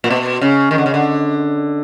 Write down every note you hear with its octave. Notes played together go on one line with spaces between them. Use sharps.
A#2
B2
C#3
D#3
D3
C#3
D3